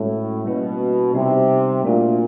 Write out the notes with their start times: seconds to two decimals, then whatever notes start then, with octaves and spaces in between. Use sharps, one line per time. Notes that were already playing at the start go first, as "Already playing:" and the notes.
Already playing: A2 G#3 C#4 F#4
0.44 B2 G3 A#3 C#4 E4
1.14 C3 G3 B3 D#4
1.84 A#2 A3 D4 F#4